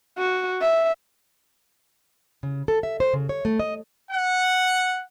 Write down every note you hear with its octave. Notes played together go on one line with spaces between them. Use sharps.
F#4
E5
C#3
A4
E5
C5
C#3
C#5
A3
D#5
F#5